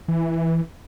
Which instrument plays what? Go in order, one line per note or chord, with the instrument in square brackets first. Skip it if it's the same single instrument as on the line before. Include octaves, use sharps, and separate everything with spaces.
[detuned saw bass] E3